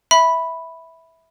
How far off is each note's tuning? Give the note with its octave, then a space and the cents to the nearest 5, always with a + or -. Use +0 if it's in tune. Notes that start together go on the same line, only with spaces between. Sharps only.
E5 -10 B5 +0